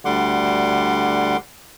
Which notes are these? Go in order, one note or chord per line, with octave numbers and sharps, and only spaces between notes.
D2 D3 G3 F#5 C6 D6